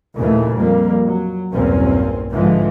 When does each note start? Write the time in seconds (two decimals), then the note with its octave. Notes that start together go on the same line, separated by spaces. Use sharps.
0.17 D#2 A#2 C#3 E3 A3
0.55 F2 G3 A#3
1.07 F#3
1.51 B1 E2 G2 A#3 C4 C#4
2.32 G#2 D3 E3 F3 G#3